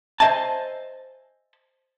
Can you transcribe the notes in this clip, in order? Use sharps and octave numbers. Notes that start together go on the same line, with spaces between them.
C5 D#5 E5 G#5 A5